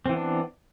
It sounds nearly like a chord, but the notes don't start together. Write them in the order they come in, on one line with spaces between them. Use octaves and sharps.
C4 E3 B3 D4